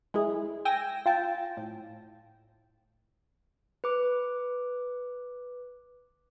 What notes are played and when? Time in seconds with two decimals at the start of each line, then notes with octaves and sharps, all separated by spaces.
0.14 G#3 E4 G#4
0.65 G5 G#5 E6 A#6
1.06 F4 G5 A5
1.57 A2
3.84 B4 D6